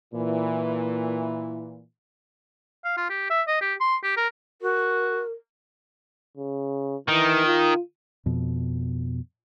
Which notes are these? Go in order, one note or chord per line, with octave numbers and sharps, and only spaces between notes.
A#2 E3
F5
F4
G4
E5
D#5
G4
C6
G4
A#4
F#4 A#4
C#3
D#3 E3
F4
F2 B2